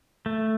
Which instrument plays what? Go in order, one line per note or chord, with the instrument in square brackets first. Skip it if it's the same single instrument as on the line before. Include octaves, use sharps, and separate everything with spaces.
[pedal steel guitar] A3